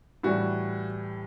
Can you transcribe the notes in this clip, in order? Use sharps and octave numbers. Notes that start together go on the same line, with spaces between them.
A2 E3 G3 F#4